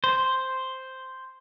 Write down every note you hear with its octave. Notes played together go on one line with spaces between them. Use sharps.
C5